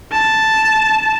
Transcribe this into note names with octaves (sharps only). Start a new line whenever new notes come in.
A5